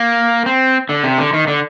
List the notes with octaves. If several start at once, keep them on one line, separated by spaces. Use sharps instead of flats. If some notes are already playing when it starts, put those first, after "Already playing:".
Already playing: A#3
C4
D3
C3
D3
D#3
D3